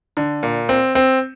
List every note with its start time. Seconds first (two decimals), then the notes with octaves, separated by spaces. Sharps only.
0.17 D3
0.43 A#2
0.69 C4
0.95 C4